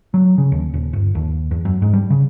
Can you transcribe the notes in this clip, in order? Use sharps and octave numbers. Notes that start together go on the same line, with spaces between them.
F#3
C#3
D#2
D#1
G1
D#2
E2
F#2
G#2
G3
C#3